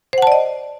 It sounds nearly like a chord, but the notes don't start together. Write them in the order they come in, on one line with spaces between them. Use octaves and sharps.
C5 F#5 A5 D5 D#5